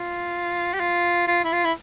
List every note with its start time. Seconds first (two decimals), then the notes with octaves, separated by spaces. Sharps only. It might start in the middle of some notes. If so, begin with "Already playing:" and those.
Already playing: F4
0.74 G4
0.80 F4
1.28 F4
1.44 E4
1.52 F4
1.64 E4